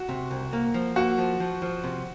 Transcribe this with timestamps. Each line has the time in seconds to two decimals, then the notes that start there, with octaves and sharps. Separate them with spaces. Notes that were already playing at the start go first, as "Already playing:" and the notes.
Already playing: F#4
0.09 C3
0.31 C2
0.53 A#3
0.74 F3
0.96 A#3 F#4
1.18 F3
1.40 F3
1.62 F3
1.84 C3